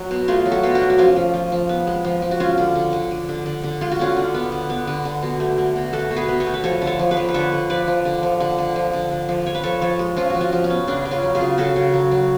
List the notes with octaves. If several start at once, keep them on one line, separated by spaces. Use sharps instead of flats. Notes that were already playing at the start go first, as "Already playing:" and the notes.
Already playing: F#3
B2
A3 F4 G#4
F#3
F#4 A4
B2 F4
D4 F#4
F#3
F#4
F3 C#4 F4
F3
F3
F3
B3
G#3
F3
F3
F#4
G#3 C#4 F4
D3
D3
D3
D3
D3
D3
D3
G#3 F4
F#4
D3 C#4 F4
D3
B3
D3
B3
D3
D3
B2
A3
A3
B2
A3 F#4 A4
B2
G#4 B4
B2
A4 C#5
A3
B4
F3 A4 C#5
D3
A4 C#5
F3
G#4 B4
F3
B4
D3 A4 C#5
D3
F3 B4 D5
F3
D3
F3
D3
D3
F3
D3
D3
F3
F3 C#5
B4
F3 A4 C#5
F3 A4 C#5
G#3
F3 C#4 F4
F3 F#4
C#4 F4
F3
C#4
B3
C#3 D4
C#3
C#4 F4
F#3
F4 G#4
C#3
C#3 F#4 A4
C#3
F#3
F#3